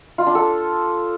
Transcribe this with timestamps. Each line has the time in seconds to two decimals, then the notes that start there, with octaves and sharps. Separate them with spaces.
0.18 F4
0.27 D4
0.35 A4